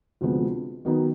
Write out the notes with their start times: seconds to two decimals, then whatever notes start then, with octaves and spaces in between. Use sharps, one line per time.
0.21 D2 C3 F3 G#3 B3
0.85 D#3 F#3 B3 D#4